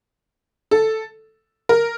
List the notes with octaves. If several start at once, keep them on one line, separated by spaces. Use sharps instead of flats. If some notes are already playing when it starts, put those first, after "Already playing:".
A4
A#4